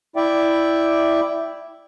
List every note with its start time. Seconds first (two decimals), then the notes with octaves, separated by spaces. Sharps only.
0.16 E4 D5 E5 G5